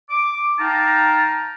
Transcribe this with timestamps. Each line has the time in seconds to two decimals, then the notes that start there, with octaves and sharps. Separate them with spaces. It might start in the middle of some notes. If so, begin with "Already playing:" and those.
0.10 D6
0.59 D#4 F5 G5 A5 A#5